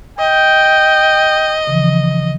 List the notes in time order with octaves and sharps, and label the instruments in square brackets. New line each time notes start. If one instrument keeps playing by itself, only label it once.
[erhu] D#5 [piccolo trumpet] G5
[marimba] C#3 E3 F3